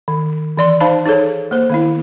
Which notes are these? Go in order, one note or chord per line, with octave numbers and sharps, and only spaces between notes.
D#3
E3 D5 C6
D#4 C5 F5 A5 B5
D#4 G#4 A4 C#5
A#3 C5
D#3 B3 E4